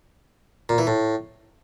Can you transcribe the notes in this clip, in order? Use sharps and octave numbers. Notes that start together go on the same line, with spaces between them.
A#2
E3
A2